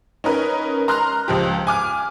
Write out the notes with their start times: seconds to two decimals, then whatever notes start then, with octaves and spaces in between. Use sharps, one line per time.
0.24 C#4 D#4 A#4 B4
0.88 A#5 C6 F6 F#6
1.28 C#2 F3 G4
1.67 G#5 D6 F6